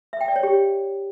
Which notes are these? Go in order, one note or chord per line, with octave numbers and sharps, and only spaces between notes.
E5
G5
D5
C#5
G4